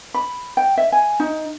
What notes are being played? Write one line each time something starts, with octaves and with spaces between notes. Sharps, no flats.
B5
G5
E5
G#5
D#4